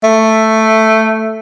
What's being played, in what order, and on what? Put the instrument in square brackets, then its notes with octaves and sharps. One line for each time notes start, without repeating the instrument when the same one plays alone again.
[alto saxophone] A3